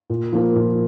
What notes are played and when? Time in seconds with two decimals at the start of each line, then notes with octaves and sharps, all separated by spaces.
0.10 A#2
0.32 F3 A#3
0.55 A#2